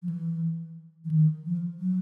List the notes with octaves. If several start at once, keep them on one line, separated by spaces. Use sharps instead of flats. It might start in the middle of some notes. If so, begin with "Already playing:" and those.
F3
E3
E3
D#3
F3
F#3